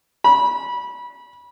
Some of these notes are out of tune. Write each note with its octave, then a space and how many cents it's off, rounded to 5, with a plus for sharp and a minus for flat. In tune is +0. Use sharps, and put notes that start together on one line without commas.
B5 -25